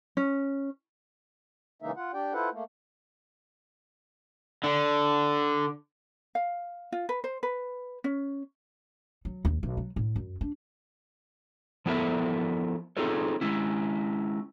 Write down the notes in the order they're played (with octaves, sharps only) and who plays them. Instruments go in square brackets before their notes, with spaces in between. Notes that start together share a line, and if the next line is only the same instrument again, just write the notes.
[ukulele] C#4
[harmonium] C#3 E3 G#3 A#3 D#4 E5
F4 F#5
D4 G4 D5 G5
E4 F4 A4 B4 C5 F#5
A3 A#3
[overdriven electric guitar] D3
[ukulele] F5
F4
B4
C5
B4
C#4
[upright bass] F#3
D#2
B1
F#3
A2
F#2
D4
[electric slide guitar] F3 B3 E4 A4 A#4 E5
C4 D#4 F4 G#4 A4 C#5
G#3 C#4 E4